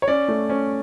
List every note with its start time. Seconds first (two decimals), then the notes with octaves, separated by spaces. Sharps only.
0.02 C#5
0.08 C#4 D5
0.28 A3
0.49 C#4